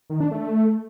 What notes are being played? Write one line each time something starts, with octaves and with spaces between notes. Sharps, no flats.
D#3
D4
A3